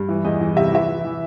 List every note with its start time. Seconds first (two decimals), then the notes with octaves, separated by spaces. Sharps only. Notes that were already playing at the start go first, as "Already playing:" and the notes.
Already playing: G2
0.09 E3
0.25 E2 D#5
0.41 E3
0.56 C3 E5
0.73 E3 E5
0.88 E3
1.05 E3